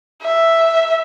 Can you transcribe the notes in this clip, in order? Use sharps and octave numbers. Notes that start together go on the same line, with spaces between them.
E5